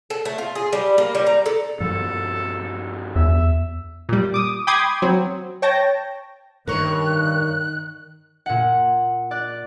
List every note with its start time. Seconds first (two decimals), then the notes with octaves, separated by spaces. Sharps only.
0.10 A4
0.25 A3
0.38 F4
0.55 G#4
0.73 G3
0.98 A#3
1.15 G3
1.27 A#5
1.46 A4
1.80 G2 F3 A4
3.16 E2 E5
4.09 A#2 G3
4.34 D6 D#6
4.67 G5 B5 C6 D6 D#6 G#6
5.02 F#3 C4
5.62 C#5 G5 A5 A#6
6.67 G2 D#3 A#4 C#5 F#6
8.46 A#2 F#5
9.31 D5 F#6